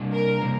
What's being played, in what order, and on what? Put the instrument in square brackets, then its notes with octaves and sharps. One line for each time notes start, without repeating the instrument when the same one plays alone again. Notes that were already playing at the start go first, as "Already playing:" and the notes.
Already playing: [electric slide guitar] C3 G3 A#3 D4
[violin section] A#4
[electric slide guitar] C3 G3 A#3